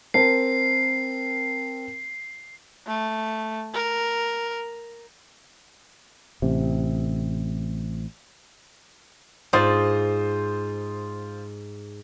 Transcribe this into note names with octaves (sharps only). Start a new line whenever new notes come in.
C4 A#4 A5 C7
A3
A#4
A1 C3
G#2 F4 C5 D5 D#6